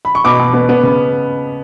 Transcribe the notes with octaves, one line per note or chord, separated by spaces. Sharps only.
B5
C#6
B2 B5 D6
B2
B3
B3
C#3